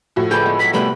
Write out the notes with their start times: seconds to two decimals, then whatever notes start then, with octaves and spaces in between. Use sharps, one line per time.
0.16 A2 F3 F#4
0.31 D3 G4 G#4 B4 G5 G6
0.46 G#3 B3
0.59 F#3 G#4 B6
0.74 C3 G3 A3 B3 B4 G5 B5